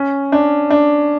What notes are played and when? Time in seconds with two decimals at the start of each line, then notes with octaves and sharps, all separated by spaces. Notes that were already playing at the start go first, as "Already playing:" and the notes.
Already playing: C#4
0.32 D4
0.70 D4